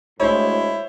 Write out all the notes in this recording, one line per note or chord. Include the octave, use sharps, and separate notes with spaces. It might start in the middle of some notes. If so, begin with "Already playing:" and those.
D2 A2 G#3 E4 C5 C#5